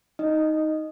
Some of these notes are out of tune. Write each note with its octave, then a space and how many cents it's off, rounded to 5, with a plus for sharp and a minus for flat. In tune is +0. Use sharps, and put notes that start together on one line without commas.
D#4 +10 D#5 -10